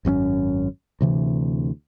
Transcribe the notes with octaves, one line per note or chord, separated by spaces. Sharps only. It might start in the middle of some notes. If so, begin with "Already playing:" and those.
G#1 F#2 C4 C#4
D2 C3 E3